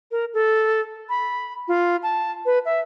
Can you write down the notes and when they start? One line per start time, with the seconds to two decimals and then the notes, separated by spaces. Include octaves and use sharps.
0.11 A#4
0.34 A4
1.09 B5
1.68 F4
2.03 A5
2.46 B4
2.65 E5